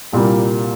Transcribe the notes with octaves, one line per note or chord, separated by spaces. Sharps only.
C2 A#2 G3 A#3